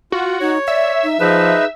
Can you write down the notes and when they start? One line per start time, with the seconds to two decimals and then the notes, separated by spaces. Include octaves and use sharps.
0.12 F4 F#4
0.41 D#4 C#5
0.68 D5 E5
1.03 D#4
1.20 F3 D#4 G#4 B4